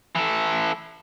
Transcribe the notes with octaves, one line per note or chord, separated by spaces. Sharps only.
E3 A4